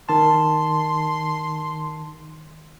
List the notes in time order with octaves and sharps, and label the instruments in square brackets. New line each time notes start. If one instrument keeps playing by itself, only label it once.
[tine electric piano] D#3 A5 [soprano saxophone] C6